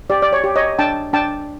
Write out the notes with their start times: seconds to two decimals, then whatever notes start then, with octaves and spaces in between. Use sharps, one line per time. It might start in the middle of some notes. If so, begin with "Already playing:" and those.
0.10 G4 D5
0.22 D5
0.33 C#5
0.44 G4
0.56 C#5 D#5
0.78 D4 G5 A5
1.13 D4 G5 A5